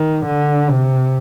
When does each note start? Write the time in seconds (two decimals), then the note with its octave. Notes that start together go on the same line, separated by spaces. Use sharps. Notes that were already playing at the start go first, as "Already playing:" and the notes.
Already playing: D#3
0.26 D3
0.69 C3